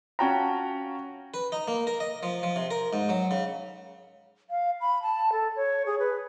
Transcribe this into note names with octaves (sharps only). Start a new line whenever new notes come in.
C#4 F4 F#4 G5 A5 A#5
B4
D#4
A#3
A#4
D#5
F3
F3
C3
A#4
G#2
F#3
C#3
F5
B5
A5
A4
C#5
G#4
B4